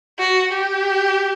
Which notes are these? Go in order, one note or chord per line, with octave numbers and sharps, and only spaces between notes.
F#4
G4